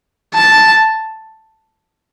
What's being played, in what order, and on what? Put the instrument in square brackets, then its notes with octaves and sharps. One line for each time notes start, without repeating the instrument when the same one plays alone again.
[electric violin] A5